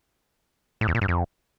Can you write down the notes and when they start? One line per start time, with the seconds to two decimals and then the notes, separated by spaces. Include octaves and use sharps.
0.81 A2
0.88 E2
0.95 A#2
1.01 G2
1.08 F2